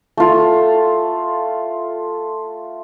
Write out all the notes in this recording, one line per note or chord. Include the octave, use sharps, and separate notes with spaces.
A3 F4